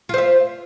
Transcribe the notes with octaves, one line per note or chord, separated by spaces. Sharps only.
F4 C5 E5